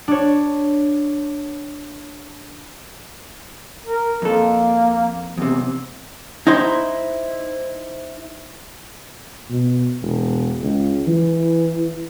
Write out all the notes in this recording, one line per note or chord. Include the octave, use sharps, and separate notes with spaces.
D4 C#5
A#4
F2 A#3 A4
E2 C3
D#4 E4 C5
B2
E1
C#2
E3